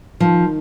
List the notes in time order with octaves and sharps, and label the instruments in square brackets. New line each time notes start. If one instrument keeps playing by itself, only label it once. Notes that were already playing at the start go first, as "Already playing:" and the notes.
[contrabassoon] D#3 [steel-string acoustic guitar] F3